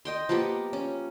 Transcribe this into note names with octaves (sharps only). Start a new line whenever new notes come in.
D#5 G5 C6
F3 A#3 B3 G4
C#4